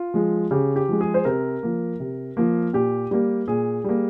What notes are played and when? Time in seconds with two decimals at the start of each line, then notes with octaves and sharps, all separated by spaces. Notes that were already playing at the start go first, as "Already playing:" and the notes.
Already playing: F4
0.14 F3 G#3
0.51 C#3 G4
0.76 G4
0.89 F3 G#3
1.01 G#4
1.14 C5
1.25 C3 A#4
1.63 F3 A#3
2.00 C3
2.37 F3 A#3
2.73 A#2 G4
3.11 G3 A#3 G4
3.48 A#2 G#4
3.84 G3 A#3